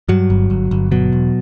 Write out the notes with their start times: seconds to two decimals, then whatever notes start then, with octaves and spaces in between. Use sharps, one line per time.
0.09 G2 F#3
0.30 G1
0.50 G1
0.71 G1
0.91 B2 F#3
1.12 E1